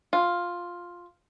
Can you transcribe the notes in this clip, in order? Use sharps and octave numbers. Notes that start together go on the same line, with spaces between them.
F4